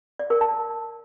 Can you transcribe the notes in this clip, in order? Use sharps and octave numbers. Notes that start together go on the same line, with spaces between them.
D5
A#4
A5